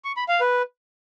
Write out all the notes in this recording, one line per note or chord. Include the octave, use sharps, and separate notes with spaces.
C#6
B5
F5
B4